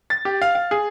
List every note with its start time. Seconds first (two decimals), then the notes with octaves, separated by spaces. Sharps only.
0.10 A6
0.25 G4
0.42 F5
0.55 F5
0.71 G#4